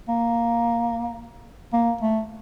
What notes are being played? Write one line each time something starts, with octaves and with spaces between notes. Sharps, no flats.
A#3
A#3
A3